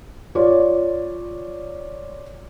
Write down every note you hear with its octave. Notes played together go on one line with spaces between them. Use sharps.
F4 C#5 D5